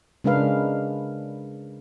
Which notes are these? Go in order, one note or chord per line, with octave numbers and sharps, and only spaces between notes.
C#3 G#3 D4 A#4 B4 F5